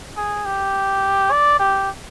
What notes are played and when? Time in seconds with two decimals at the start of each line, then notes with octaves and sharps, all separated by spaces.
0.16 G#4
0.46 G4
1.31 D5
1.59 G4